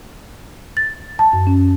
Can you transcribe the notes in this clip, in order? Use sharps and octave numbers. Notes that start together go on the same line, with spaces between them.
A6
A5
F#2
C#4